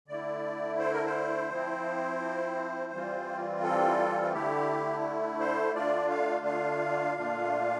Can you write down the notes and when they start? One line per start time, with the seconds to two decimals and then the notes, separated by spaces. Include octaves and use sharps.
0.08 D3 A3 E4 D5
0.79 C5
0.93 A#4
1.06 C5
1.50 F3 C4 E4
2.92 E3 G3 C4 F4
3.63 A4
4.22 F4
4.33 D3 A3 E4 G4
5.40 C5
5.74 D3 A3 D4 F4 D5
6.10 F5
6.45 F5
7.16 A#2 A3 D4 F4